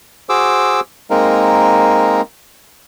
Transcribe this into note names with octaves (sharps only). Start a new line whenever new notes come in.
F#4 G#4 C5 D6 E6
G#3 A#3 C4 D#4 A#4